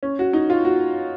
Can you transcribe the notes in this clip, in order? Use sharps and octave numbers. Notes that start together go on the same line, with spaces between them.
C#4
F#4
D#4
F4
F#4